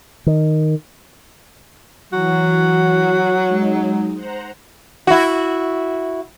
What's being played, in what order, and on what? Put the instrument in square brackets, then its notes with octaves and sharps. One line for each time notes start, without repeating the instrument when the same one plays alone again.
[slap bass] D#3
[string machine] E3 [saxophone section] F#3 [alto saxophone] F#4
[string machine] G#3 D#4
C5 F#5 A#5
[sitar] E4 F#4